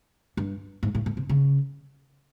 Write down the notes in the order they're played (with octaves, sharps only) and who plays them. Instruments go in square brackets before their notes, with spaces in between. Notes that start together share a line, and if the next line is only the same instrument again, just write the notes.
[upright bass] G2
G#2
A2
A2
C3
C#3